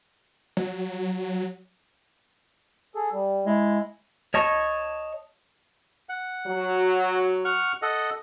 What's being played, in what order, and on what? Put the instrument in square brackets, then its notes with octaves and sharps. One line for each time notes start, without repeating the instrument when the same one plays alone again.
[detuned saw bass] F#3
[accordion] G#4 A4
G3
[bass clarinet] G#3 [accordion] E4
[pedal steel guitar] C#5 D#5 A5 C#6
[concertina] F#5
[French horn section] F#3
[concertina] F#5 C#6 F6
A4 D#5 F#5